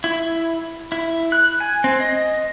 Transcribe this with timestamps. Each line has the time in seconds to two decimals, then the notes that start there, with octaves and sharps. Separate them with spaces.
0.04 E4
0.92 E4
1.32 F#6
1.60 G#5
1.84 C4
2.00 D#5